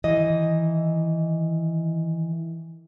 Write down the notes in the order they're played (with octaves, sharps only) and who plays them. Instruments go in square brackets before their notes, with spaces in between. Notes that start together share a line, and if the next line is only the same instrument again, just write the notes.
[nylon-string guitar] D#3 E3 D#5